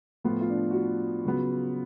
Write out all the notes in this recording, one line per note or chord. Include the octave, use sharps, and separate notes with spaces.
A2 F3 B3 F4
F4
D4
F#4
F4
C#3 F#3 B3